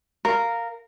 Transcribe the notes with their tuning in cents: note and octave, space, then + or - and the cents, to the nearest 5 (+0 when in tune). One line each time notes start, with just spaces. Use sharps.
A#4 -10 F5 +0